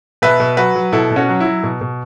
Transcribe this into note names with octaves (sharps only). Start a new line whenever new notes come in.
B2 B4 E5
B2
F#3 F#4 B4
F#3
B2 E4 A4
B2
C#4 F#4
F#3
E4
F#3
B2
B2